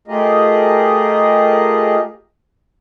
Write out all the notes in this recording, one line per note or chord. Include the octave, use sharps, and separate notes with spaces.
A3 F4 G4 G#4 A#4 D#5